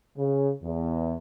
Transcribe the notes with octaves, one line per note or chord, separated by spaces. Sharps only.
C#3
E2